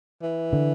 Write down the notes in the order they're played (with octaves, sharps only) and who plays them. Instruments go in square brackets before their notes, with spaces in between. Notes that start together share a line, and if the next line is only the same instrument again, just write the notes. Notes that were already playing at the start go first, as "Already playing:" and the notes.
[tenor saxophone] E3
[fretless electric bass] D3